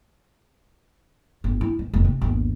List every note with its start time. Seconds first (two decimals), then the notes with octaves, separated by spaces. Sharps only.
1.44 G1
1.61 E4
1.79 D1
1.93 F1 D#3
2.05 C3
2.22 G1 D#2